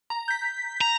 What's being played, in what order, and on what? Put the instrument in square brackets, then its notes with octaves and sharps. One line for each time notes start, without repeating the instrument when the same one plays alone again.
[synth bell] A#5
G6 B6
[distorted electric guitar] A#5